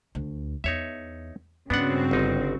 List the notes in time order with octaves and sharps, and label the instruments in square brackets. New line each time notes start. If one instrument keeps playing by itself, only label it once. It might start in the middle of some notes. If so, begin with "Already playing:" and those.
[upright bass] D2
[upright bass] E2 [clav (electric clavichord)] D#4 C#5 E5
[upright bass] G2 [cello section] C#3 C4 F#4 [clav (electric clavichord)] B3 D4 F#5
[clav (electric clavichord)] G1 D#4